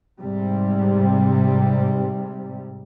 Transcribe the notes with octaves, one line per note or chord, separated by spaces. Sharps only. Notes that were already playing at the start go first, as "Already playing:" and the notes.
G#2 C3 G3